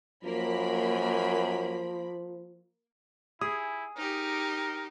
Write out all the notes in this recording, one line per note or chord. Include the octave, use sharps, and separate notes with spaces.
F#2 F3 A#3 B5
E4 G#4 D#6
D#4 G4 A#4